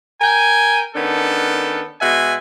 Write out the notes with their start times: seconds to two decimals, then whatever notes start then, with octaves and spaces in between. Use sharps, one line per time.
0.21 A#4 G5 G#5
0.95 D#3 B3 C#4 D4 A4
2.01 B2 G#3 E5 F#5 G#5